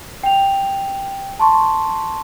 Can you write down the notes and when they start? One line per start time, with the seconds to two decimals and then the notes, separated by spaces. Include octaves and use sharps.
0.23 G5 F7
1.40 A5 C6 C#6